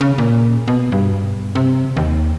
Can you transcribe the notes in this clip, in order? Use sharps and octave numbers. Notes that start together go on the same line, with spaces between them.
C#3
A#2
B2
G2
C3
D#2